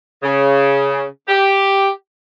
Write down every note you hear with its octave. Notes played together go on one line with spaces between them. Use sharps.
C#3
G4